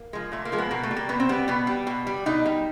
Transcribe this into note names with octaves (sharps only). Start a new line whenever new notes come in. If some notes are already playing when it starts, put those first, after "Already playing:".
Already playing: A#3
F3 G#3
A#2 A3
A#3
F3 G#3
B3
B2 A#3
A3
G3
A#3
B2 B3
C4
G3 B3
B2 B3
G3
B2
G3
B2 D#4
G3